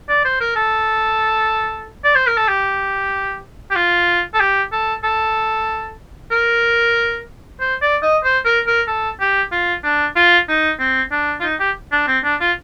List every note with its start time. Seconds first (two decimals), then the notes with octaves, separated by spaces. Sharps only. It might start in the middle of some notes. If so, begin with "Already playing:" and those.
0.09 D5
0.25 C5
0.41 A#4
0.56 A4
2.04 D5
2.15 C5
2.27 A#4
2.37 A4
2.48 G4
3.71 G4
3.76 F4
4.34 A4
4.40 G4
4.72 A4
5.04 A4
6.31 A#4
7.60 C5
7.82 D5
8.03 D#5
8.24 C5
8.45 A#4
8.67 A#4
8.87 A4
9.20 G4
9.52 F4
9.84 D4
10.16 F4
10.48 D#4
10.79 C4
11.12 D4
11.40 F4
11.43 D#4
11.60 G4
11.92 D4
12.07 C4
12.24 D4
12.40 F4